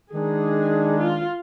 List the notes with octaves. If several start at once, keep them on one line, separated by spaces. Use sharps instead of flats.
D#3 G#3 D4 G#4
F4